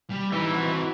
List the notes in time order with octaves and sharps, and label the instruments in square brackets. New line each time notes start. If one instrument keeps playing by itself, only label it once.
[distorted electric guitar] G3
[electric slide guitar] E3 [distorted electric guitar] D#4 E5
[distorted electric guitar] C4 F#4